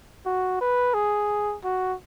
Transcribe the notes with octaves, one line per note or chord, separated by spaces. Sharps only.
F#4
B4
G#4
F#4